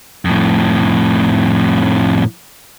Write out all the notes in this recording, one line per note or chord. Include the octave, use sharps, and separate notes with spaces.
F2 A2